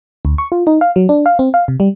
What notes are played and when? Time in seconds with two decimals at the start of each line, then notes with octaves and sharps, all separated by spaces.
0.25 D2
0.38 C#6
0.52 F4
0.67 D#4
0.81 F5
0.96 F#3
1.09 D4
1.26 F5
1.39 C4
1.54 F5
1.68 C3
1.80 G3